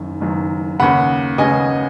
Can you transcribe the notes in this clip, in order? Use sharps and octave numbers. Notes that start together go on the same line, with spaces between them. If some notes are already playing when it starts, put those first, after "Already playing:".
Already playing: F#1 F#2 D#3
F#1 F#2 D#3
D#2 C#3 F#5 B5
D#2 C#3 D#5 G#5